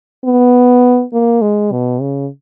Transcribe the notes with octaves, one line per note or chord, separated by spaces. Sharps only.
B3
A#3
G#3
B2
C#3